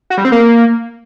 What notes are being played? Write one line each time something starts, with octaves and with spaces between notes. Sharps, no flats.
F#4
G3
C4
A#3